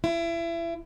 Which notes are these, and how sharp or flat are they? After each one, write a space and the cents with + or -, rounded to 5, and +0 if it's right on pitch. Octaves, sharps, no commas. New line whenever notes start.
E4 +30